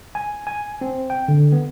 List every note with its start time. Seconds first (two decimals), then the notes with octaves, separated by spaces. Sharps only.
0.15 G#5
0.47 G#5
0.81 C4
1.10 G5
1.28 D3
1.52 B3